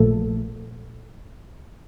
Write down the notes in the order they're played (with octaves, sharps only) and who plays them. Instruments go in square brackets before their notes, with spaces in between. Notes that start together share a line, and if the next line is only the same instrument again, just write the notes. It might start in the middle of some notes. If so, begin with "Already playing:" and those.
Already playing: [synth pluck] A#1 A#2 F3 A3 A4